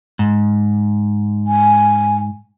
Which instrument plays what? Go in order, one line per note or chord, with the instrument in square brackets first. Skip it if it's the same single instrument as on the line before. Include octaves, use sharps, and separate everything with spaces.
[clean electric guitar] G#2
[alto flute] G#5